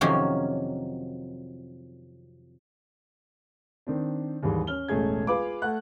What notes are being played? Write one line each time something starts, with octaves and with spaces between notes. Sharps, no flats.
F2 C3 D#3 F#3 A#3 C#4
D#3 C4 D4
D#2 G#2 E3 G3 G#3
C#4 F6 G7
E1 A1 A3 C#4 G#4 G#6
F4 G#4 B4 F5 D6
A3 F#5 F#6